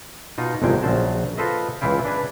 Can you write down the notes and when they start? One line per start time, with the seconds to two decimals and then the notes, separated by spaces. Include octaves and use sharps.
0.38 B2 D#4 F4
0.62 G1 C2 F2 C3 G#3 G5
0.83 A#1 C#3 F#3 C5 A5
1.37 F4 A4 B4 C5 D#5 E5
1.81 C#2 E3 E4 F4 G5
2.05 D4 B4 G#5